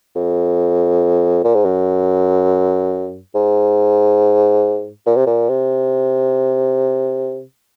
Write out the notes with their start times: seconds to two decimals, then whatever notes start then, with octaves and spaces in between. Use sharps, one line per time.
0.15 F2
1.44 A#2
1.55 G#2
1.65 F#2
3.35 G#2
5.06 A#2
5.16 C3
5.26 A#2
5.49 C3